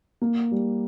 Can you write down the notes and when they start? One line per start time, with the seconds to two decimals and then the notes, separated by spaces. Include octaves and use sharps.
0.22 A#3
0.51 G3